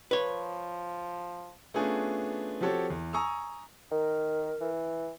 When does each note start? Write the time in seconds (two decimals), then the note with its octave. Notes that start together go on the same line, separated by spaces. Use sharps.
0.11 F3 B4 C#5
1.74 A3 B3 C#4 D4 F4 G#4
2.61 F3 C4 F#4 G4 A4 C#5
2.90 E2
3.13 G#5 A#5 C#6 D#6 E6
3.91 D#3 A#4
4.60 E3